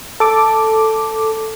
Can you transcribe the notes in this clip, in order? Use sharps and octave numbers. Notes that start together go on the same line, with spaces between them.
A4 D6